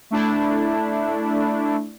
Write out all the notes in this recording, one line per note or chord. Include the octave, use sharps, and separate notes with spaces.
A3 D4 E4